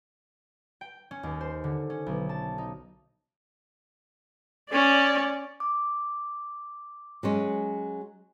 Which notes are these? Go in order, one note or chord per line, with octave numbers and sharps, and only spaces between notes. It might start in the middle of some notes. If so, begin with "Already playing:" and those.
G5
C#4
D#2
C5
D3
C#4
B1
A5
D#4
C#4 D5
D6
F#3 G#3 C#4